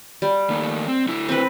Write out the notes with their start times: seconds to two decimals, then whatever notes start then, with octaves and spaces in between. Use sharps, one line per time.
0.22 G3
0.50 D#3 A3 A#3
0.88 C4
1.08 D3 E4
1.29 C4 B4